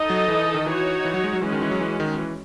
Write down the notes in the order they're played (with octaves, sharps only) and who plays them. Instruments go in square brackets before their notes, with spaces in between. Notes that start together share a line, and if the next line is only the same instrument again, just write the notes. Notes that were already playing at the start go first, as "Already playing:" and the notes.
Already playing: [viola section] D#4 A4 D#5
[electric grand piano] F#3
E3
D#3
[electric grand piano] E3 [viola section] D#4 F#4 C#5
[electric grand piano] E3
F#3
G#3
F#3
[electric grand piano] E3 [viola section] G#3 C#4 F#4
[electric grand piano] D#3
E3
F#3
E3
D#3
E3